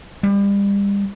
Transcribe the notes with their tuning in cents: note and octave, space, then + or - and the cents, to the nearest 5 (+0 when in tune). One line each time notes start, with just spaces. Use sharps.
G3 +35